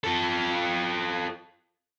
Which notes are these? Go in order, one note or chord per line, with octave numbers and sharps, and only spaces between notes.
F4 A4